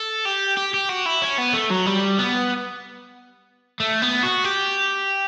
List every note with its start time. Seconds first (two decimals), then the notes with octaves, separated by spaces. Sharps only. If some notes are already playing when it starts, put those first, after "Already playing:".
Already playing: A4
0.25 G4
0.57 G4
0.74 G4
0.89 F#4
1.06 E4
1.22 C#4
1.38 B3
1.54 A3
1.71 F#3
1.86 G3
2.19 B3
3.80 A3
4.02 B3
4.23 F#4
4.44 G4